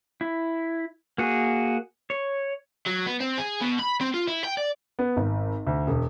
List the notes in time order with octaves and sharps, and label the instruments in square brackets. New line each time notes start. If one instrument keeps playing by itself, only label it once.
[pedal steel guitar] E4
A#3 F#4 G#4
C#5
[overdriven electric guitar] F#3
B3
C4
G#4
B2
B5
C4
F4
E4
G5
D5
[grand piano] B3
G#1
D2
E1